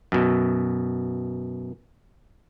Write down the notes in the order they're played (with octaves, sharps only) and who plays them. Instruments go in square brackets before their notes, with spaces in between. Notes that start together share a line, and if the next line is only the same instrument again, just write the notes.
[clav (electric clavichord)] F#2 B2